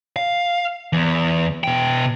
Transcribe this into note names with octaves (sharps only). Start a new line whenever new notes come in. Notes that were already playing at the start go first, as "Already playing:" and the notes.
F5
E2
B2 G5